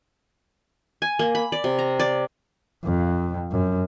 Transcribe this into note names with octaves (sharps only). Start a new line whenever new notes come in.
G#5
A#3
B5
D5
C3
A#5
D5
F2
F#2